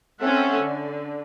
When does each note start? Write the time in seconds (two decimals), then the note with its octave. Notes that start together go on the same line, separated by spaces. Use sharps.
0.20 C4 C#4 A4 E5 F#5
0.61 D3